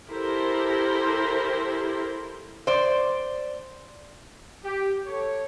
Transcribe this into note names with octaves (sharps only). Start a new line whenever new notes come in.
E4 G4 A4 A#4 C5
C5 D5
G4
A4 C#5